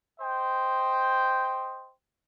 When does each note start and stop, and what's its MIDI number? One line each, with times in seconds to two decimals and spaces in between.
0.20 1.91 72
0.20 1.91 75
0.20 1.91 79